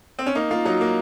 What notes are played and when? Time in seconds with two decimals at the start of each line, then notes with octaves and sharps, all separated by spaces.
0.19 C4
0.26 C#4
0.35 A#3 D#4
0.51 A#3 F4
0.65 F#3 D#4
0.81 A#3